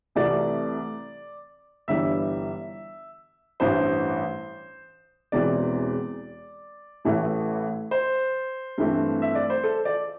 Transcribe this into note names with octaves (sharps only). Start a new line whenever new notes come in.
C2 C3 E3 A3 D5
G1 G2 E3 G3 E5
A1 G2 E3 C5
E1 E2 E3 C4 D5
A1 A2 E3 A3
C5
G2 E3 A3 C4
E5
D5
C5
A4
D5